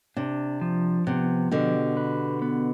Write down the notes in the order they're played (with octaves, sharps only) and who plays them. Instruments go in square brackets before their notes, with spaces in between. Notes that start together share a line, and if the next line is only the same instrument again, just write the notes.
[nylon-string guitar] C3 [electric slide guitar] D4
[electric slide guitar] F3
[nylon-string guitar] C3 [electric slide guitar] B3
[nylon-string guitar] B2 D3 [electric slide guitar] G4
[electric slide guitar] B4
B3